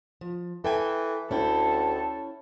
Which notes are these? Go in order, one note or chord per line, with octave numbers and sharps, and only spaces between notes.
F3
E3 A4 G5 G#5
D2 C#4 E4 A4 G5